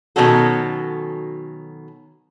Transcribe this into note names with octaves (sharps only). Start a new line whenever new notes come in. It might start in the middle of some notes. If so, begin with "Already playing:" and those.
B2 D#3 F#3 C#4 F#4 A4